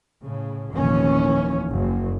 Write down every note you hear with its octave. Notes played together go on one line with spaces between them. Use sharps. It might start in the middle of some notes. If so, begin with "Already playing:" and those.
A2 C#3
F1 D#2 A#2 E3 C#4
F#1 F#2